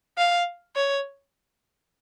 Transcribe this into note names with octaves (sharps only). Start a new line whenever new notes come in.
F5
C#5